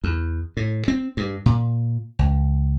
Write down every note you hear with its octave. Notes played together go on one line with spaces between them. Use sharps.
E2
A2
C4
G2
A#2
C#2